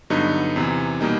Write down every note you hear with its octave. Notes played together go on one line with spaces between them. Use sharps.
G2 D3 F#3 B3 D#4
E2 C3 E3
B2 G3 A#3 D#4